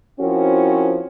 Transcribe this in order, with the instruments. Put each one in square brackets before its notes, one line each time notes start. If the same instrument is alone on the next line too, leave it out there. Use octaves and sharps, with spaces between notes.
[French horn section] F3 C4 C#4 E4 F#4 A#4